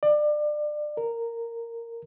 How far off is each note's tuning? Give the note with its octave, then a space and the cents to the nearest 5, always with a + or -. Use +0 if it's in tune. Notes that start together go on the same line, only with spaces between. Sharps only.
D5 +25
A#4 -10